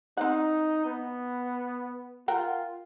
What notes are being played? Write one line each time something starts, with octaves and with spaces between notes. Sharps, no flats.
C4 D#4 F#5
B3
F4 A#4 F#5 G5